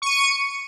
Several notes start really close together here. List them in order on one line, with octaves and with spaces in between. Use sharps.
C#6 D#7 C#7